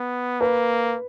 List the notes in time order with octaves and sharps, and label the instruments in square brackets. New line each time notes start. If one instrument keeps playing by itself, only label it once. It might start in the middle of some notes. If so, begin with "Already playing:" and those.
Already playing: [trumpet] B3
[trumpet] A#3 [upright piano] B4